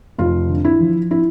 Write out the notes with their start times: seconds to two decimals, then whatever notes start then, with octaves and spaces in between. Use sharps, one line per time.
0.18 F1 F4
0.49 D3
0.65 E4
0.80 F3
1.11 E4